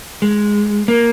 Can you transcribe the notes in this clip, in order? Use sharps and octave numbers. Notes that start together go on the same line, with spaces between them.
G#3
A#3